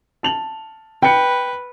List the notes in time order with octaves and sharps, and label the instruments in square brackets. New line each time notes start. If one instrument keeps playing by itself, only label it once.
[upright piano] A5 F7 F#7
[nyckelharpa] B4 [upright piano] G5 C#7